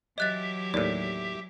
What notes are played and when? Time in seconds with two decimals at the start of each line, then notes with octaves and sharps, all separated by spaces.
0.18 E3 F#3 G4 D#5 E5 F#6 A6
0.74 D#2 A2 D5